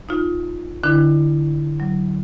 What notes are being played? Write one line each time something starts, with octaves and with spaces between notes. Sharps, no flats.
D#4 F4
D3 D4 E4
F#3